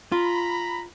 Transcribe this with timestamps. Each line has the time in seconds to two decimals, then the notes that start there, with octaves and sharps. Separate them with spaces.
0.12 F4 A#5 B5